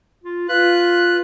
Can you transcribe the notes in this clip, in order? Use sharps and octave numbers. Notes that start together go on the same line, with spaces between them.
F4
F4 B4 F#6